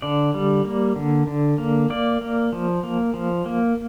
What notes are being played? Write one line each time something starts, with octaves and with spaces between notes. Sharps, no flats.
D3 D5
G3
A#3
D3
D3
A#3
A#3 D5
A#3
F3
A#3
F3
A#3